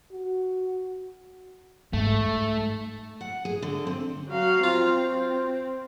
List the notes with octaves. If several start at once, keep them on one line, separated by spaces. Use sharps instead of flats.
F#4
G#2 A3
F#5
G#4
D3
C4
F#3 F5
C4 F4